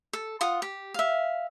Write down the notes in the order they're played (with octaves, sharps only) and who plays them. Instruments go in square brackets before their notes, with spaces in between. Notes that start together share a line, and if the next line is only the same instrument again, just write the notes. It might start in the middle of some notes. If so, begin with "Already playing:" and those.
[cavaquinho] A4
F4 F#5 D#6
G4
E5 F5